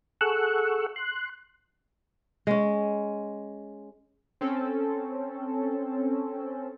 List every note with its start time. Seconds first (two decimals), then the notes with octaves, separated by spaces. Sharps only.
0.21 G#4 A4 F#5 C#6 E6 F#6
0.96 C6 F#6
2.47 G#3 C#4
4.41 C4 C#4 A4